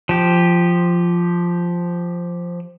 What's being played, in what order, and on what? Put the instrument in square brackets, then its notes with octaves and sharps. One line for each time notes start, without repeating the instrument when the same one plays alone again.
[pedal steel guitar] F3 G4